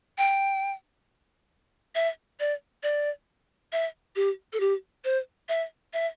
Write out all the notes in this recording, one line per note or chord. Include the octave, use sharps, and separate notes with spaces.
G5
E5
D5
D5
E5
G4
A4
G4
C5
E5
E5